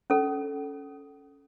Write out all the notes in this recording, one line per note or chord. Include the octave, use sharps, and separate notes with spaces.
C#4 A4